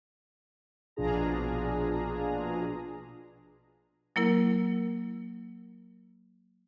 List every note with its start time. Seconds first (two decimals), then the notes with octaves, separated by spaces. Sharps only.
0.96 A#1 B2 D4 F4 G#4 A#5
4.16 F#3 A#3 E4 A#4